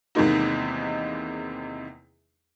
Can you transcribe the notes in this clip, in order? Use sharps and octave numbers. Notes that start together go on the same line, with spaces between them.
E2 C3 D#3 G#3 A#3 D#4